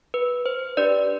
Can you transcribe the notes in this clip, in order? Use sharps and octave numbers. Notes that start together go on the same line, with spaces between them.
B4
C5
D4 G4 B4 D5